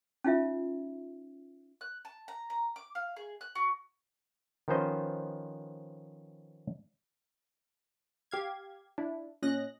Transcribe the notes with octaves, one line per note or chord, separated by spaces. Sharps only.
C#4 D#4 F4 E5
F#6
A5
A#5
A#5
D6
F5
G#4
F#6
F#4
D#3 F3 B3 C#4 C5 D#5
G4 F5 G#6
D4 E4
A#2 C#4 D#5 F#6 A#6